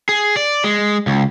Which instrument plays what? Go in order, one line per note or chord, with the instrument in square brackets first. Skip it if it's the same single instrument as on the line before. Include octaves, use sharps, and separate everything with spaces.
[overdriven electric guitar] G#4
D5
G#3
C#2